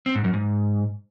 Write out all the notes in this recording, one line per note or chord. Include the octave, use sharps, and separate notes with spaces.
C4
G#2
F#2
G#2